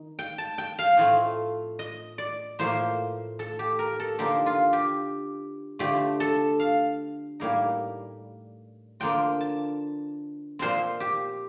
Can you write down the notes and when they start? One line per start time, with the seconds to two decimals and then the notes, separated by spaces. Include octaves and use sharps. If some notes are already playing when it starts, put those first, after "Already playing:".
Already playing: D#3 D#4
0.19 G5
0.38 A5
0.58 G5
0.79 F5
0.97 A2 F3 A3 C4 F4
1.79 D#5
2.18 D5
2.59 A2 F3 A#3 C5
3.39 A4
3.59 G4
3.79 A#4
4.00 A4
4.19 D3 F3 A#3 D#4 G4
4.46 F4
4.73 G4
5.79 D3 F3 A3 G4
6.20 A4
6.60 F5
7.40 A2 G3 A#3 D#4
9.00 D3 F3 A#3 D4 F4 G5
9.40 A5
10.59 A#2 F3 C4 F4 C5
11.00 G4